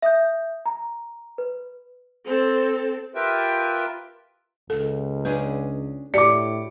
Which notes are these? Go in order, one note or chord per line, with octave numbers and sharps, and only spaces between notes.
E5 D#6 G6
A#5
B4
C4 A4
F4 G4 A#4 B4 E5 G5
C#2 A4
C#4 D4 G#4 B4
A2 G4 D5 D6 C#7